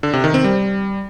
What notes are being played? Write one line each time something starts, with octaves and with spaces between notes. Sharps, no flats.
D3
C3
D#3
C4
G3